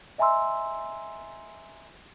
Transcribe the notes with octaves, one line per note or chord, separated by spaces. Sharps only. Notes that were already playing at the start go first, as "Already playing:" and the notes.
D#5 E5 G#5 A#5 C6 E6